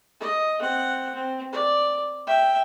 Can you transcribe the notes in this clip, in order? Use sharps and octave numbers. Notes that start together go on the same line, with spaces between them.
D#5
C4 F#5
C4
D5
E5 G5